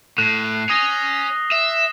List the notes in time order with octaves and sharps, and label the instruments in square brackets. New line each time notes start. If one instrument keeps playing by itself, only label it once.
[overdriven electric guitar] A2 [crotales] F#6 C7
[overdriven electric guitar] C#5 G#5 [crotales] D#6 A#6 G7
[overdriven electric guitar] E5